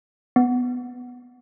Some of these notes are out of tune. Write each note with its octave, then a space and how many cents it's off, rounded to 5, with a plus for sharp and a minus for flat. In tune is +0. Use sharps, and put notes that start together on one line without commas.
B3 +5